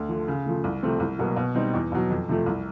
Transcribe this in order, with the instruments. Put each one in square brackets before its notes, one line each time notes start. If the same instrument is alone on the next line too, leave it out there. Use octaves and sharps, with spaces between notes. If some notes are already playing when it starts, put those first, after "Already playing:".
Already playing: [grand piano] D2
D3 F3
C#3
F3 A3
C2
C3 F3 A3 C4
C2
B2 F#3 A#3
B2
G3 C4 D#4
E2
B2 F#3
F2
C3 F3 A3
C2